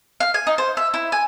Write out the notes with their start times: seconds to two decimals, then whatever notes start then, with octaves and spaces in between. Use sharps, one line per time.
0.20 F5
0.34 G#5
0.47 D#4
0.58 C5
0.77 E5
0.94 E4
1.12 G#5